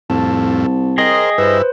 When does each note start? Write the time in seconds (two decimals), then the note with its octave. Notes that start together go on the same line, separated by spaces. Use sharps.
0.10 C2 F2 A2 A5
0.98 G#4 A#4 C5 D#5 G5
1.38 G2 E4 B4 C5